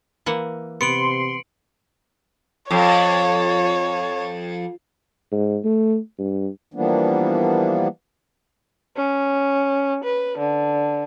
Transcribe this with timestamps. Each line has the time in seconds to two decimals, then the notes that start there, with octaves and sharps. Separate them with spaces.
0.26 E3 A#3 F#5
0.81 C3 B3 C6 C#7 D7 F#7
2.71 F2 C#5
5.32 G#2
5.65 A3
6.18 G2
6.74 E3 F3 G3 A#3 B3 D4
8.96 C#4
10.05 B4
10.38 D3